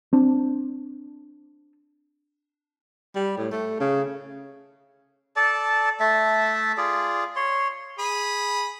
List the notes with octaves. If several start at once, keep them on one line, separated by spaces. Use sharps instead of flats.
C4 D4
G3
A2
A3
C#3
A4 D5 A5
A3 E5 A5
F4 G#4 D5
C#5 C6
G#4 B5